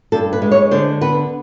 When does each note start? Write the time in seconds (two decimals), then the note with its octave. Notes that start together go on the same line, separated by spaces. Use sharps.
0.12 G2 A4
0.33 B4
0.42 G#3
0.52 C#5
0.71 D3 C5
1.01 B3 B4